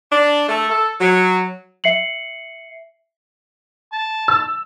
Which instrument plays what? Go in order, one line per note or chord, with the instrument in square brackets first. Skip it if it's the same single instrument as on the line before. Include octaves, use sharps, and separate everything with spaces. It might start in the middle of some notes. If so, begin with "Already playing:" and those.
[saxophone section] D4
A3
A4
F#3
[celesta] E5 C7 C#7 F#7
[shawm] A5
[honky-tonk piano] E6